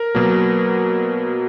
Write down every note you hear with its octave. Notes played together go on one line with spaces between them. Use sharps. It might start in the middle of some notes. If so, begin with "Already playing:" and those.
Already playing: A#4
B2 F#3 A#3